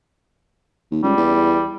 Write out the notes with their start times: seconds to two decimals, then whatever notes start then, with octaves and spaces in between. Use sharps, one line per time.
0.91 D#2
1.03 C#2 G3
1.16 E2